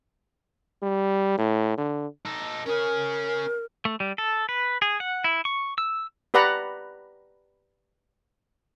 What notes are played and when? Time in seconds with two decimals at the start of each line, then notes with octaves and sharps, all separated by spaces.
0.82 G3
1.38 A2
1.78 D3
2.25 D#4 A4
2.66 C#4 G#4 A#4
3.85 A3
4.00 G3
4.18 A4
4.49 B4
4.82 G#4
5.00 F#5
5.24 E4
5.45 C#6
5.78 E6
6.34 G4 B4 D5 F#5 A#5 B5